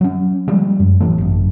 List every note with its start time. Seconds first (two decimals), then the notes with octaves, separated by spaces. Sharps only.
0.01 F#3 C#4
0.48 F3 G3 G#3
0.80 F#2
1.00 A1 E3 A3
1.18 G#1 F#2